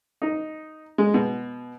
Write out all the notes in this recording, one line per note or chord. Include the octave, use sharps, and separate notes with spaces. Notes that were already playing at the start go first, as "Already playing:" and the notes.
D#4
G#3
B2